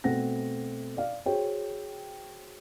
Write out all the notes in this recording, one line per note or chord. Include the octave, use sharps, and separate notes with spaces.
B2 A3 C4 F#5 A#6
D5 F5
F#4 G#4 C5 C#5 G5